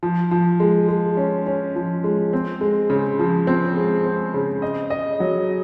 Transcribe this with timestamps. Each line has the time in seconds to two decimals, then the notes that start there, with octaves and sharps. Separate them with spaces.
0.03 F3
0.31 F3
0.60 G#3
0.88 G#3
1.17 C#4
1.46 C#4
1.76 F3
2.04 G#3
2.33 C4
2.61 G#3
2.90 C#3
3.19 F3
3.47 C4
3.77 G#3
4.05 C4
4.34 C#3
4.62 D#5
4.90 D#5
5.20 F#3